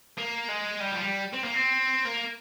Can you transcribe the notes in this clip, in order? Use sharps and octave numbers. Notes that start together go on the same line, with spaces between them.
A#3
G#3
G3
F3
G3
C4
A#3
C4
A#3